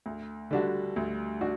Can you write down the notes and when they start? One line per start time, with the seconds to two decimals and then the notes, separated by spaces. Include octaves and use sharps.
0.06 D2
0.51 D3 G3 D4 F#4
0.96 D2
1.41 D4 F#4